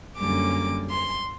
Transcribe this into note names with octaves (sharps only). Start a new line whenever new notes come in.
F#2 D3 G3 A#3 C#4 D6
C6